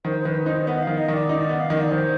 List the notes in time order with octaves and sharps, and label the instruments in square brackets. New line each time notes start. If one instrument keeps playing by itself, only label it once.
[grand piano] D#3 [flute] C5
[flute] C5
[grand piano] D#3 [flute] B4
[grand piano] D#4 [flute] C5
[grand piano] B3 [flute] D#5
[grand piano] D#3 [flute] F5
[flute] D#5
[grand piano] D#3 [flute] D5
[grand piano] D#4
B3
[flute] F5
[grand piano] D#3 [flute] D#5
[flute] D5
[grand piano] D#3 [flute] C5